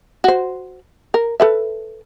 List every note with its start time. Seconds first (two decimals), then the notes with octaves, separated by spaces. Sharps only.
0.24 F#4 C5
1.14 A#4
1.40 A4 B4 E5